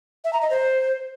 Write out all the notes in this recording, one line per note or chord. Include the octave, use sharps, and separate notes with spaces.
E5
A#5
D#5
C5